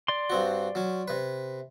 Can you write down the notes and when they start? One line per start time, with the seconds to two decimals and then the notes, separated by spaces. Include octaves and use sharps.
0.08 D5 C6
0.30 G2 C4 F#4
0.75 F#3 C#4
1.08 C3 B4